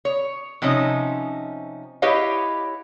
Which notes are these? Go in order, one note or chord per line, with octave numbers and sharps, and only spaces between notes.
C#5
C3 F3 C#4 D#4
E4 G4 B4 C#5 D#5 F5